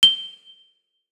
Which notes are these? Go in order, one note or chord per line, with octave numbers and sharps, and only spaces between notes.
G7